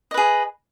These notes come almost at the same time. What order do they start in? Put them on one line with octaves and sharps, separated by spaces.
D#5 B4 G#4